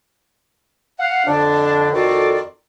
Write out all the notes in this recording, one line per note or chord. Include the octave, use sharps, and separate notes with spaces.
F5 F#5
F2 D3 D4
F2 D#3 F4 F#4 A4 D5